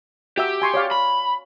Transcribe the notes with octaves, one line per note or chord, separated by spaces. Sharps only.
F#4 G4 E5 E6
G#5 C6 C#6
C#5 D5 F5
B5